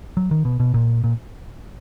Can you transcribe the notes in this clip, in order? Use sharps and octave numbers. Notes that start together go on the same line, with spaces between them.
F#3
D#3
B2
B2
A#2
A#2